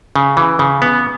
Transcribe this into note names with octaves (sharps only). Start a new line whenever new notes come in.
C#3
E3
C#3
B3